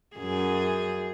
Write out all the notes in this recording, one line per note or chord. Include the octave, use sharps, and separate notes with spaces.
F#2 G#4